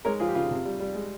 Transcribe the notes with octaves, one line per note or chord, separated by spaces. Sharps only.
G#3 A#4 C#5
F3 F4 G#4
G4
C#3 F4
C3
G3
G3
G#3